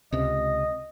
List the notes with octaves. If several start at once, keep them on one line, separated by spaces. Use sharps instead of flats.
C#2 C3 D#5